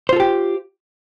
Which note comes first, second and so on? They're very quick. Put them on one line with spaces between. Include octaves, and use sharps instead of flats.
C5 F4 A4 G4